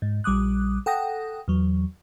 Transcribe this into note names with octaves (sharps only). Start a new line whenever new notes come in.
G#2
A#1 G3 D6 D#6 F#6
A4 F#5 G5 D#6 A#6
E2 F#3